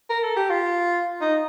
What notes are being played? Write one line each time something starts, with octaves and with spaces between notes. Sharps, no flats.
A#4
A4
G4
F4
D#4